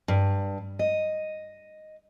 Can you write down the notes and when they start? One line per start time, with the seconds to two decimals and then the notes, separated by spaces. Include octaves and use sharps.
0.08 G2
0.79 D#5